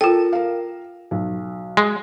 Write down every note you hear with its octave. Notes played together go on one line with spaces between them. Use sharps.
F4 A4 A#4 G5
A#4 F5
B1
G#3